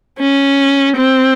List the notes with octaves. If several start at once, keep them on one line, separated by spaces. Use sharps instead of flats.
C#4
C4